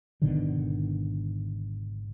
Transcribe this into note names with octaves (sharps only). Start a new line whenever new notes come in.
G#1 B2 D3 D#3